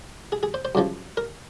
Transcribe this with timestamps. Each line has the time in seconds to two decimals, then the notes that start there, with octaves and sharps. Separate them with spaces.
0.32 G#4
0.43 G#4
0.54 C5
0.65 C5
0.75 F#2 C#3 F3
1.17 A#4